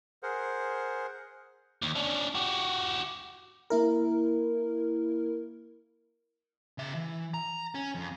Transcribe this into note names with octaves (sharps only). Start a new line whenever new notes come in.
G#4 A#4 C5 F#5
D#2
C#4 D4
F#4 G4
A#3 E4 A#4
C#3 E5
E3
A#5
C#4
F2